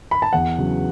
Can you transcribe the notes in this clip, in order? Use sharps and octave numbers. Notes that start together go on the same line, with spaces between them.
B5
A5
E2 F#5
C#3 F#3